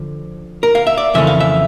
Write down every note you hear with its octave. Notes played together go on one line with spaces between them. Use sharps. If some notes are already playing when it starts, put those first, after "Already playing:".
Already playing: D3 F3
A#4
F5
E5
D5
F2 C#3 E3 A3 C#4 E5
F5
E5